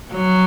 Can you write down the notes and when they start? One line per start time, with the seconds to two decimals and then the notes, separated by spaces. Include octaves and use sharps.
0.13 F#3